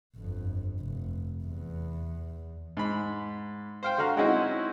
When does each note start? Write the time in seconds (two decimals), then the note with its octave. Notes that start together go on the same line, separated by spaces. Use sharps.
0.16 G1 F2
0.79 F1
1.43 E2
2.77 G#2 B5
3.83 C5 F5 G5
3.98 D3 F#4 F5 A#5
4.16 G#3 C4 C#4 D#4 E4 F#4